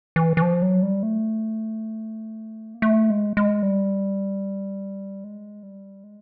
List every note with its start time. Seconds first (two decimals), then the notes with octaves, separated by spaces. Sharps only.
0.16 E3
0.37 E3
0.42 F3
0.62 F#3
0.83 G3
1.03 A3
2.74 A#3
2.82 A3
3.10 G#3
3.37 G#3
3.63 G3
5.24 G#3
5.63 G3
6.04 G#3